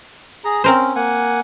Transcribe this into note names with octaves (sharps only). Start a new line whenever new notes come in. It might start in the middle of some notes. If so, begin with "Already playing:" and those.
G#4 A#5
C4 C#4 A#4 C5
A#3 F#5 G#5